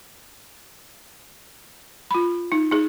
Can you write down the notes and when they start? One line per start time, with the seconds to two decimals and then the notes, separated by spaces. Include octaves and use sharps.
2.11 F4 B5
2.52 D#4
2.71 D#4 G#4